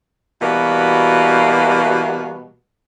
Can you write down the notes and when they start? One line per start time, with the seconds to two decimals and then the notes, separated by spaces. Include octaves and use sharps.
0.42 B2 E3 G3 A#3 F#4 B4